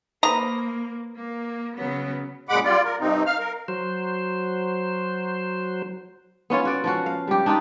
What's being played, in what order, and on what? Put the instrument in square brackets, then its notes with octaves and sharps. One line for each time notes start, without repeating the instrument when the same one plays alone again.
[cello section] A#3 [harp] B4 C5 D#6 [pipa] A#5
[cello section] A#3
C#3 F#3 B3
[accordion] F#2 A#2 G#3 F#5 B5 D6
G3 F4 D5
A#4
G2 C3 C4 D#4
F5 F6
A#4
[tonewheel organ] F#3 C5
[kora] B3 C#4 F4 C#5
F4 F#4 D5
F3 C#4 F#4
F5
G3 G4
D4 D#4 F4 G4